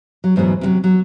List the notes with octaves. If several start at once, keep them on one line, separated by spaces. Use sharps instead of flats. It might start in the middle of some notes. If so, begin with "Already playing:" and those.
F#3
E2 G#2 B2 F#3 A3
C3 E3 F#3
F#3